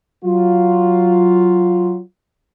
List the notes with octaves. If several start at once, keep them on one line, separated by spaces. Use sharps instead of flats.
F#3 F4